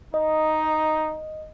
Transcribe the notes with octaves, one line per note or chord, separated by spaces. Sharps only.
D#4 D#5